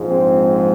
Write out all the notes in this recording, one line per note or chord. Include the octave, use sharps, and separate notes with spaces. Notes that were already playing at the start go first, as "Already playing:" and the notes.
Already playing: A#1 G#2 F3 G#3
C4